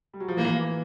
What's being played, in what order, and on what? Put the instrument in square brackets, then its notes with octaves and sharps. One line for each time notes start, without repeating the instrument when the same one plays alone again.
[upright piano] G3
F#3
F3
[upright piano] E3 [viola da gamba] A#3